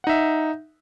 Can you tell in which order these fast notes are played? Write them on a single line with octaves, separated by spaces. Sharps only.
F#5 D#4 E5